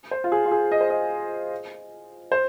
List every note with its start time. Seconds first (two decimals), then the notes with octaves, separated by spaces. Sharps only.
0.11 C5
0.24 F4
0.32 G#4
0.45 F4
0.52 G#4
0.72 D#5
0.81 C5
0.90 D#5
2.32 C5